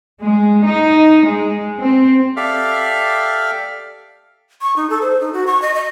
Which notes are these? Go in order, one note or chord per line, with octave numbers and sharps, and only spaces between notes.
G#3
D#4
G#3
C4
G4 A4 D5 E5 F5 F6
C#6
D#4
A4
C5
D#4
F#4
C#6
D#5
D#5